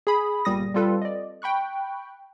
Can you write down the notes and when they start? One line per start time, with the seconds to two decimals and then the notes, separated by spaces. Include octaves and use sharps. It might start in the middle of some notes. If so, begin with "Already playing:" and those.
0.07 G#4 B5 D#6
0.45 G1 A#2 G3 D#6 A#6
0.74 G3 C4 F4 A4 B4
1.02 D5 D#5
1.42 G5 B5 C#6 F#6